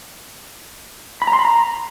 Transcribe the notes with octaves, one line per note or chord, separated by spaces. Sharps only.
B5
A#5
C6
B5
A#5